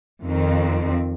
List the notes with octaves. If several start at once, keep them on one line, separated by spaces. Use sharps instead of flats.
F2 D#3 C4